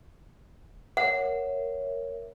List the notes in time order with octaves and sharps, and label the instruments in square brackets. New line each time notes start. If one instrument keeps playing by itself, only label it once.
[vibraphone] A#4 C#5 E5 [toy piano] F#5